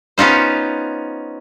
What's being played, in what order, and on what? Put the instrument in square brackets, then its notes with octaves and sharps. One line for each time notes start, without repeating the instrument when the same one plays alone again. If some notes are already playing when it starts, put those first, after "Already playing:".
[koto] B3 C#4 D#4 F4 C5